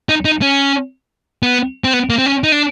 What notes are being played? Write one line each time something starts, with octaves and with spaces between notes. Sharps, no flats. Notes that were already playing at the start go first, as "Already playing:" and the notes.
D#4
D#4
C#4
B3
C4
B3
A#3
C4
C#4
D#4
D4